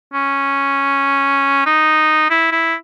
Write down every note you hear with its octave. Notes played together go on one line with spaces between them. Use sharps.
C#4
D#4
E4
E4